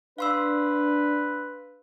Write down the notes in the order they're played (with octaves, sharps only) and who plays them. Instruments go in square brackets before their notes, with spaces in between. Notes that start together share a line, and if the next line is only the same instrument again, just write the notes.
[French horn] D4 [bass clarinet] B4 [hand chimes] F5 C6 E6